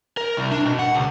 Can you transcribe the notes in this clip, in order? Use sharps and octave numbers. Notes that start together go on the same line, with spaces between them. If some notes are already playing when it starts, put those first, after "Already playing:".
A#4
C2
D4
B2
F#5
C#2